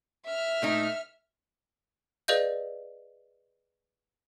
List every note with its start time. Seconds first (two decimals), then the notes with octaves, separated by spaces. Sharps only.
0.25 E5 F6
0.62 A#2 A3 D#4
2.28 G#4 B4 D5 D#5 F5 G6